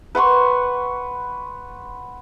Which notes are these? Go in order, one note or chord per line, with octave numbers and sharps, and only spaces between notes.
B4 F#5 C6 C#6